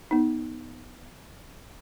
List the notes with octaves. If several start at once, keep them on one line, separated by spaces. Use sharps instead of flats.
B3 D#4